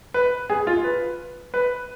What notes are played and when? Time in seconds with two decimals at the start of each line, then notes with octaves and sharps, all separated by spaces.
0.14 B4
0.50 G#4
0.67 F4
0.84 B4
1.54 B4